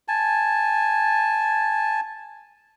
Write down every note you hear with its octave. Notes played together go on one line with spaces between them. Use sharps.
G#5 A5